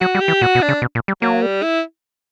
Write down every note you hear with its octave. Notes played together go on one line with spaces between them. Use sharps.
F#3 F#4
G3
G4
E3
A#2 F#4
B2
D4
C#3
B2
A#2
G3
F#3 A#3
G3
E4